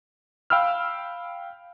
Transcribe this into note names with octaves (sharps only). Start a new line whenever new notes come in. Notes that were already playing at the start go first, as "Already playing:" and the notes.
F5 G5 B5 E6 F6